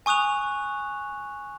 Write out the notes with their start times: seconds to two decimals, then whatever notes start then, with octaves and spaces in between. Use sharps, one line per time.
0.06 G#5 C#6 D#6 F#6 F7